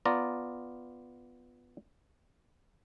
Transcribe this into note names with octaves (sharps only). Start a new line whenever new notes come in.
B3 F4 D5 A#5